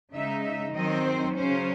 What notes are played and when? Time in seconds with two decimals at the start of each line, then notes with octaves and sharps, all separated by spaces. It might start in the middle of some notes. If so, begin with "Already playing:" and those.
0.13 C#3 G#3 D#4 E5
0.44 E5
0.74 D#3 F#3 C4 D#4 D#5
1.06 C5
1.36 C#3 F#3 C#4 C5